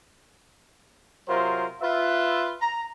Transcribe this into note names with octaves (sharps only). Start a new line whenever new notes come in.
C3 F#3 F4 A#4 C5
F4 B4 E5
A#5